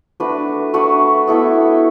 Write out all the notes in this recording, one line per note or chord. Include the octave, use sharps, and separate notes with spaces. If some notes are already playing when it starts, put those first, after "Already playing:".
A3 D4 F#4 B4
A3 D4 F#4 B4
B3 E4 A4 E5